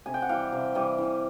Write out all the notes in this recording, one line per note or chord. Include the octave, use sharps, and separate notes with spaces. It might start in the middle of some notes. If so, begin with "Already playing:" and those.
C3 G#5
G5
F#5
E3 G3 F5 G5
C3
E3 G3
E3